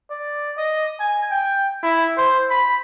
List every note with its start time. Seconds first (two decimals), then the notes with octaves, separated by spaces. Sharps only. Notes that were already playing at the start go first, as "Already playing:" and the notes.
0.10 D5
0.58 D#5
1.00 G#5
1.31 G5
1.83 E4
2.17 C5
2.50 B5